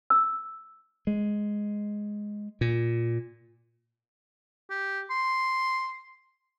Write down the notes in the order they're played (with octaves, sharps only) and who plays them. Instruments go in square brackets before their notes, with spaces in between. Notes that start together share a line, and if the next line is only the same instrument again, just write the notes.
[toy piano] E6
[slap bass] G#3
A#2
[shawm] G4
C6